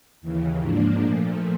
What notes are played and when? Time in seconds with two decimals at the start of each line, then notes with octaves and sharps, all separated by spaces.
0.21 D#2 C#3 E3
0.61 G#2 F3 A#3 D4
1.02 A#2 F3 A3